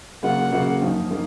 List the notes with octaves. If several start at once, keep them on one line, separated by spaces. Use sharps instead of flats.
C#3 F#3 A#3 F4 F#5
C#3 F#3 A#3 F4
F#2 F3 A#3 D#4
F3 A#3 D#4